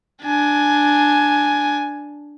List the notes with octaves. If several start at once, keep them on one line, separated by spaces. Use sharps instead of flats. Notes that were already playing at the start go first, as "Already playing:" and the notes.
D4 G#5